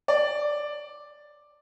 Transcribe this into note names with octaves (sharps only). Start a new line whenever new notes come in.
D5